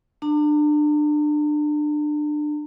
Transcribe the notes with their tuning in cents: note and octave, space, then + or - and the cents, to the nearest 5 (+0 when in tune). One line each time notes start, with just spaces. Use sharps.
D4 +25 A#5 -45